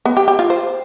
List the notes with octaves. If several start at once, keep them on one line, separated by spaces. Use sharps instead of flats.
B3
G4
G4
F4
C5